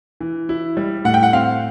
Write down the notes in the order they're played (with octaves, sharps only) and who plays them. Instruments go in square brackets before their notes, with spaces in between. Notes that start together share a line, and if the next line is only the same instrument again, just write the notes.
[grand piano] E3
E4
G3
[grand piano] A2 [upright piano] F#5
[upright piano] G5
F#5
[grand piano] C4 [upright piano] F5